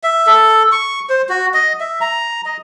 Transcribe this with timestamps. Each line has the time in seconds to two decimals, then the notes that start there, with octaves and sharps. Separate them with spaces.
0.03 E5
0.27 A4
0.72 C#6
1.09 C5
1.29 F#4
1.54 D#5
1.80 E5
2.01 A#5
2.46 D#5